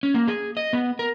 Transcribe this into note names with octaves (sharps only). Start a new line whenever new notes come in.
C#4
A#3
G#4
D#5
B3
A#4